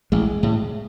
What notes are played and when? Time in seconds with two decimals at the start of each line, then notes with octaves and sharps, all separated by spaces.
0.12 A1 G#3
0.43 A2